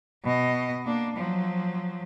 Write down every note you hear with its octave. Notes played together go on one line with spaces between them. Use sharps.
B2 D#5
A#3 D4
F3 F#3